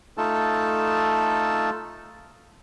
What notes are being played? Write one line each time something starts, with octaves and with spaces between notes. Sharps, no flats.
A3 D#4 F4 A4 A5